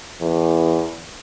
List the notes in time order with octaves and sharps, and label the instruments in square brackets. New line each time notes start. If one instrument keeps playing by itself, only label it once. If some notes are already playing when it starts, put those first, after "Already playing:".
[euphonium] E2